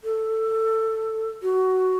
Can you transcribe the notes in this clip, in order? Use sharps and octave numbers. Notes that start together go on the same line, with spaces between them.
A4
F#4